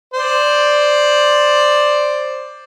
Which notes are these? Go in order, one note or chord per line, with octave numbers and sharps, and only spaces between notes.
C5 D5